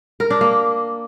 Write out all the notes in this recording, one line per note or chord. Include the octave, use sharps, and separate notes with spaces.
A#4
D4
A#3